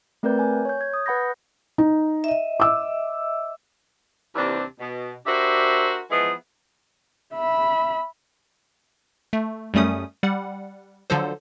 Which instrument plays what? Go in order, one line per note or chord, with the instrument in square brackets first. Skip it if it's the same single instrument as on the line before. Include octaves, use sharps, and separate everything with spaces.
[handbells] A3 C4 A#4 B4 D5 G6
G#5
C#5 G6
G#6
D#6
B4 F#5 B5 G6 A#6
[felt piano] D#4
[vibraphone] D#5 E5
[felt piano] D6 E6
[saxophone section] D#2 C3 E3 C4 D4
B2
D4 F#4 G4 A#4 C5 E5
E3 F3 G#3 B3 E4 G#4
[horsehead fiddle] E5 B5
[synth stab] A3
F#2 G3 A3 C#4 D#6
G3 F#5
D3 F3 F#3 A4 C5